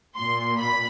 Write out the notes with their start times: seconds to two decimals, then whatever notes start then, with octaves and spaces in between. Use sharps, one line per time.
0.18 A#2 C6
0.59 B5